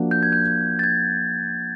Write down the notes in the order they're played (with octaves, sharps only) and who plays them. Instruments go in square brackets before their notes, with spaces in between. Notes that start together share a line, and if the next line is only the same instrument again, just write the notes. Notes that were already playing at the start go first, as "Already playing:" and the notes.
Already playing: [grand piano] F3 A#3 D4 F#4
[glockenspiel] G6
G#6
G6
A6
G#6